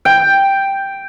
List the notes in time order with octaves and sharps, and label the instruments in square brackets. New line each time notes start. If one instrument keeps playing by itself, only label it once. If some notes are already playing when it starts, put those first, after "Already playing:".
[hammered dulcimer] G5